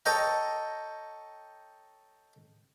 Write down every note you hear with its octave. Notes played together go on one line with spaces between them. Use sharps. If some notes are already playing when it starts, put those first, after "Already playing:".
A4 C#5 D#5 G5 A#5